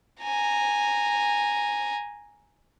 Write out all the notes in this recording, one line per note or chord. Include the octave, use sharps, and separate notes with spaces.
G#5 A#5